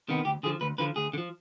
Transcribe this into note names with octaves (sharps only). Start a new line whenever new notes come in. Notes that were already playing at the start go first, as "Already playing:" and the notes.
C3 D#3 B3
D2 G4
D3 F3 G#4
D2 B4
D3 F3 B4
D2 G#4
D3
F3